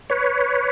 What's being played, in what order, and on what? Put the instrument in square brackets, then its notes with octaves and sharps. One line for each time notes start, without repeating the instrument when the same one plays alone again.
[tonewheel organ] B4 C#5